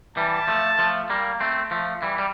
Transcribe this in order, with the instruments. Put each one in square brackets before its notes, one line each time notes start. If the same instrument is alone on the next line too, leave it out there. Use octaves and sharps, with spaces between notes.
[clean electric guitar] E3 G3 [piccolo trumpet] A5
[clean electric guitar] F3 A3
F3 A3
G3 A#3
A3 C4
F3 A3
E3 G3
G3